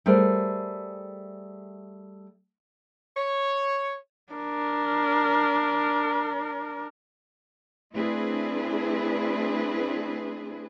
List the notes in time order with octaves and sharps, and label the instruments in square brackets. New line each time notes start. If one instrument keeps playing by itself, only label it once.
[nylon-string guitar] G3 A3 G#4 A#4 C5
[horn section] C#5
[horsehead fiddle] D4 A#4
[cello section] A3 C4 D4 E4 G#4 B4